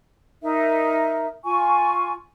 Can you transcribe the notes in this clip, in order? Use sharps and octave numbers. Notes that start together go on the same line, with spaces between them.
D#4 A#4 E5
F4 G#5 C#6